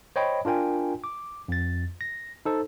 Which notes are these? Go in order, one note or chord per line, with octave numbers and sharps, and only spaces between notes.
C5 C#5 D#5 G5 B5
D4 F4 A#4 G5 G#5
D6
F2 A6
A#6
D#4 A4 C5